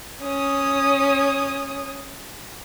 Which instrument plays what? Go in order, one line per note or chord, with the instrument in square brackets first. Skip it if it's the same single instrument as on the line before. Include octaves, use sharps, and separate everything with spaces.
[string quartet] C#4 D#6